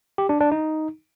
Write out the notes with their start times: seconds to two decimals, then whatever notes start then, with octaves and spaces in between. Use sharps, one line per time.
0.18 G4
0.29 D4
0.40 D4
0.52 D#4